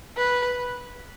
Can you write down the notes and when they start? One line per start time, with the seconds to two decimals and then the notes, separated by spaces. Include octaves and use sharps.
0.17 B4